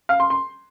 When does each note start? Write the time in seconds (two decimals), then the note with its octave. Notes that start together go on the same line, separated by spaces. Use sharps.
0.09 F5
0.20 C6
0.30 C6